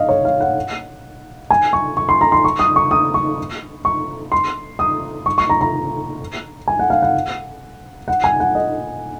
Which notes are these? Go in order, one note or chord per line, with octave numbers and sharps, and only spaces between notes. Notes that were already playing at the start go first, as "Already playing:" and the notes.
Already playing: D#5 F5
C#5
F5
F#5
G#5
C#6
C#6
C6
A#5
C6
C#6
D#6
C#6
D#6
C#6
C#6
C6
D#6
C#6
C#6
A#5
A#5
G#5
F#5
F5
F#5
F#5
G#5
F#5
D#5